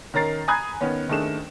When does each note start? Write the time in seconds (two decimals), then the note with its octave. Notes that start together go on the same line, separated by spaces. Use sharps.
0.14 D#3 C#4 A#4 A#5 A6 C7
0.48 G#5 A#5 B5 D#6 F#6 G#6
0.81 D#3 B3 C#4
1.08 F#1 D#3 A3 D4 G#4 E7